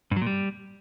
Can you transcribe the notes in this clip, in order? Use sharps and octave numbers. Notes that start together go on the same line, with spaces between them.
G2
F#3
A#2
G3